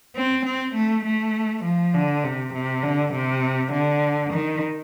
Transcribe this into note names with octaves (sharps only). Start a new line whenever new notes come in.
C4
C4
A3
A3
F3
D3
C3
C3
D3
C3
D3
D#3